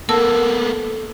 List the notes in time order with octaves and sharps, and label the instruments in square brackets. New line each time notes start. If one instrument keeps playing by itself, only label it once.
[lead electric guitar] A#3 B3 [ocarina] A4 [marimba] A#4 A5 E6